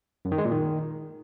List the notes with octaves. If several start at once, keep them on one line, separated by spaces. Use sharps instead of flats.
F#2
D#3
G#3
A#2
D#3